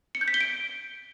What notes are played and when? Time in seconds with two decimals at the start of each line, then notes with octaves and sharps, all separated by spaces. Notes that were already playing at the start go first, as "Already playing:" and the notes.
0.15 C#7
0.21 G6
0.28 B6
0.34 G7
0.41 D7